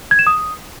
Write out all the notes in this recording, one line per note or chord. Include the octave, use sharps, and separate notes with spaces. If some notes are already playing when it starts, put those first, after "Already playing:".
G#6
E7
D#6